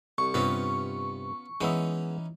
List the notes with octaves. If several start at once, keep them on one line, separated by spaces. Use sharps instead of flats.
C2 C#6
G2 C3 B3 C#4 F4
E3 G#3 B3 C#4 D#4 E5